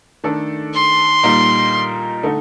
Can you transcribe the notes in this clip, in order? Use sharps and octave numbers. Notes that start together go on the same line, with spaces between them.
D#3 A3 D4 A4
C6
A#2 G3 A#3 D#4 A#4
D3 A3 D#4